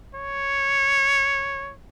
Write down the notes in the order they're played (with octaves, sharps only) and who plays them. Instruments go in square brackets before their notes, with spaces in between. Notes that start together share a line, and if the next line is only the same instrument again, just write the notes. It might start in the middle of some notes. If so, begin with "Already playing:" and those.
[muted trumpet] C#5